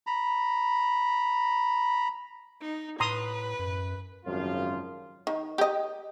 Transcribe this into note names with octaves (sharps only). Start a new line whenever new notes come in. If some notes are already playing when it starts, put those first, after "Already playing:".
A#5 B5
D#4
A2 B4 A#5 C6 D#6
F#2
G#1 F#2 C#3 F3 G3 F4
D#3
G4 D#5